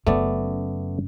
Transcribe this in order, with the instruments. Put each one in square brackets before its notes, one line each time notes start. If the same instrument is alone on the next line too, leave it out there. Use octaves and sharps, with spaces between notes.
[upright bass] F#1 C#4 [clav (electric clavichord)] A3 B3 D5